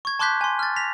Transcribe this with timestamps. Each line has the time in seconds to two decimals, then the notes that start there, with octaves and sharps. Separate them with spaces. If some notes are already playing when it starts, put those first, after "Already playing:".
0.05 C#6 G#6
0.19 A5 C6 D6 F#6 G6 B6
0.41 G#5 C6
0.59 F6 A6
0.76 A#6 B6 F7